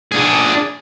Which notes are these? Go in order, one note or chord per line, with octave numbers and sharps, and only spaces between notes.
D4 G#4